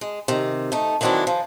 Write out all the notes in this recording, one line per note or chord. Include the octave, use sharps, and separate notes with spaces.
G#3
C3 D#3
A3 D#4
D#3 E3 F#3 C4 D4 E4
F3